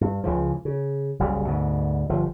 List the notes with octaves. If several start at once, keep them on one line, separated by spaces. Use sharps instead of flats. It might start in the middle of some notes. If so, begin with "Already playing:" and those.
G2
C#2 C#3 E3 F3
C#3
F#1 C2 C#3 G3
D2 G#2 B2
G1 F3